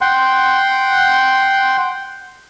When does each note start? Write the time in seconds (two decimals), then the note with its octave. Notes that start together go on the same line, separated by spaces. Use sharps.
0.01 F#5 G5 C6